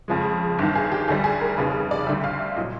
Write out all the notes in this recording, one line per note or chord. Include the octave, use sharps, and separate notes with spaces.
F2 C#3 F3 G#3
G1 G2 D#3
G#4
G4
D2 D3 G3 G#4
G#4
A#4
F1 D#2 C#3 B4
D5
D2 D3 G3 E5
F5
E5
A#2 F#3 D#5